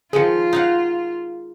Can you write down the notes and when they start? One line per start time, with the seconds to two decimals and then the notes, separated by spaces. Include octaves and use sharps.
0.13 D#3 F3 G#3 F4 G#4 C#7
0.53 D#4 F5 F#5